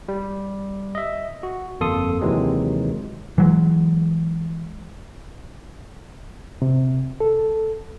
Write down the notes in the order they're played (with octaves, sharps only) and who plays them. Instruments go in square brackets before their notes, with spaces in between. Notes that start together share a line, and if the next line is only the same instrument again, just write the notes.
[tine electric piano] G3
D#5 E5
F#4
G1 F2 A#3 A4 C6 D#6
D#2 C3 D#3 E3 F#3 G#3
[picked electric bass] E3 F#3 G#3
[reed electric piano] C3
A4